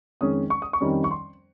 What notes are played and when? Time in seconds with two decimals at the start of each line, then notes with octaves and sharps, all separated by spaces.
0.21 F2 D#3 G#3 C#4 D#6
0.50 C#6
0.62 D#6
0.73 C#6
0.81 F2 D#3 G3 C#4
1.04 C#6
1.11 C6